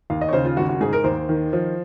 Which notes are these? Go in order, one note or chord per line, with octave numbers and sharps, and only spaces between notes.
D#2 F5
D#5
C#5
C#3 C5
F4
G#1 F#4
F#4
G#2 G#4
A#4
D#2 C5
D#3
F3